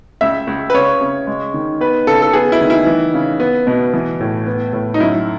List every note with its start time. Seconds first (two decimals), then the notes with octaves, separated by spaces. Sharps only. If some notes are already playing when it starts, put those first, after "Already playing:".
0.21 C#2 E5
0.47 C#2
0.70 B4
0.74 C#3 C#5
1.01 C#3
1.27 G#3
1.54 D#3
1.81 B3 B4
2.07 C#3 A4
2.22 A4
2.33 B3 G#4
2.52 E4
2.61 D#3
2.70 E4
2.86 E3
3.14 C#3
3.40 B3
3.67 B2
3.94 E3
4.20 A2
4.47 B3
4.73 A2
4.94 D#4
5.00 F#2 E4